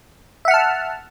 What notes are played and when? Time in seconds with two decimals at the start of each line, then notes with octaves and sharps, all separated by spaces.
0.45 E5
0.48 F#5
0.51 F6
0.54 A5